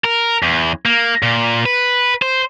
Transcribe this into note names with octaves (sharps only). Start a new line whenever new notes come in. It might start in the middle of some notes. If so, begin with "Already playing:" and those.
A#4
E2
A#3
A#2
B4
C5